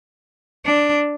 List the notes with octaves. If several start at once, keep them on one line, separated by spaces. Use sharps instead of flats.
D4